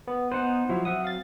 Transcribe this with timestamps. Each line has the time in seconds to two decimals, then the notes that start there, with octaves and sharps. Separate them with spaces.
0.07 B3
0.32 B3 D#4 B4 C5 F#5
0.69 F3 F#3 E4
0.85 F#3 C4 E5 F#5 D#6
1.04 F5 A6